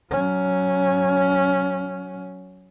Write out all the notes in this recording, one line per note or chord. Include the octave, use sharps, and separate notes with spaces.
F#3 C#4